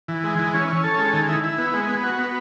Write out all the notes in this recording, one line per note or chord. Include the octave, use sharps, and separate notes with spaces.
E3
G#3
E3
C#4
C#4
A4
G#3
D#3
E4
E4
B3
G#3
B3
F#4
B3